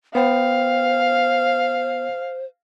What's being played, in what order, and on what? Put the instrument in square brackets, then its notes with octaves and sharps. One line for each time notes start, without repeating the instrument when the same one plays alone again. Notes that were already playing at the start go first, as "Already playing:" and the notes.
[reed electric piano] B3 G5 [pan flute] C5 [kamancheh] F5